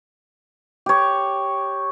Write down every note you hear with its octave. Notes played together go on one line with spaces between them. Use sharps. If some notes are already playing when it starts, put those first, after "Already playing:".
G4 C#5